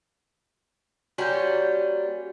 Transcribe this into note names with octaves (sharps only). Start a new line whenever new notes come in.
G3 A#3 C#4 F#4 G6